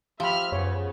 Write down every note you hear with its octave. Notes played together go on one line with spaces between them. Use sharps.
F3 G4 E5 B5 F6
F#2 C#3 B3 C#5